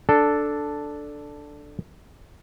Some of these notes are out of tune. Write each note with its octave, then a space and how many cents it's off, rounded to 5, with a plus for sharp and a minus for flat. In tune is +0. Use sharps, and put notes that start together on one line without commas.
D4 +0 A4 +0